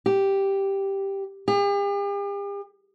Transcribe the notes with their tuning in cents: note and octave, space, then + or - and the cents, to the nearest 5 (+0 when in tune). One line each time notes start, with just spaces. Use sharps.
G4 +0
G4 +45